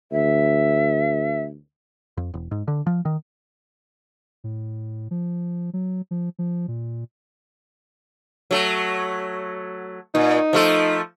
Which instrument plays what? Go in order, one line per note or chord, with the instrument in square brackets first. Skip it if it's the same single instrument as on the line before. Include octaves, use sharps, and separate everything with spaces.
[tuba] D2 [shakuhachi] E5
[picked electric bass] F2
E1
G#2
D3
F3
D#3
[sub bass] A2
F3
F#3
F3
F3
A#2
[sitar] F#3 A3
[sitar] A#2 [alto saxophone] D#4
[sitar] F3 A3 A4